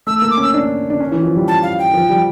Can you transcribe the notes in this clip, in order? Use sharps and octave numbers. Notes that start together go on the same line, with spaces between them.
A3 E6
E6
A#3
D6
C#4 E6
D4
D4
C#4
E3
F3
G3
A5
F5
G5
F3
G3